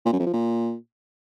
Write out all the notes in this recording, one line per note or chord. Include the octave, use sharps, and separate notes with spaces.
A#2
F#2
F2
F3
A#2